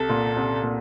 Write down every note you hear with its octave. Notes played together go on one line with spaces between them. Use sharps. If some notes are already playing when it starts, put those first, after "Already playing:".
Already playing: C2 A4
A#2
C2
A#2